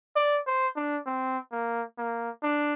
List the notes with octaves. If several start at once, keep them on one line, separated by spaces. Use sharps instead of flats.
D5
C5
D4
C4
A#3
A#3
D4